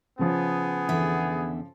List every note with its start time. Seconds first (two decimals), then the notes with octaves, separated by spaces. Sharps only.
0.19 C#3 F3 B3 G#4
0.89 E2 D3 E5